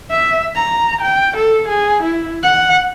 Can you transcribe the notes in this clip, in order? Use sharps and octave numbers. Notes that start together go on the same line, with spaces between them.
E5
A#5
G5
A4
G#4
E4
F#5